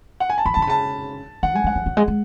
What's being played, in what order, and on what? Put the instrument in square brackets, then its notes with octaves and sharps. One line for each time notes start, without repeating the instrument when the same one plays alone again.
[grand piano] F#5
G#5
A5
[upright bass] E3 [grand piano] B5
[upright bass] D3 [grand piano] A5
[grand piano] B5
[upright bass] C#3 [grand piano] A5
[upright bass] D3 [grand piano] F#5
[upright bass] G#3 [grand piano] G#5
[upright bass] G#3
[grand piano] F#5
[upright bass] F#3
F#3
G#3
G#3